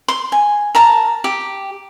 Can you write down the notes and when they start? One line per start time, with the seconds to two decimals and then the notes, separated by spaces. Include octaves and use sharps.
0.08 C6
0.32 G#5
0.75 A#4 A5 A#5
1.24 G4